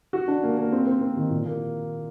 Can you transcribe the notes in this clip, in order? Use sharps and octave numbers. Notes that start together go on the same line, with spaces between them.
F#4
D4
A#3
A#3
C4
C4
C4
D#3
A#2
A#3